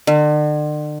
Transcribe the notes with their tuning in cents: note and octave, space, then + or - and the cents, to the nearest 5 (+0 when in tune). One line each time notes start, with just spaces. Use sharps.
D3 +40